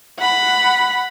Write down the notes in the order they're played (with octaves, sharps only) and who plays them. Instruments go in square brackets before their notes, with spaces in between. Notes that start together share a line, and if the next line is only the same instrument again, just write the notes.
[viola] F#5 B5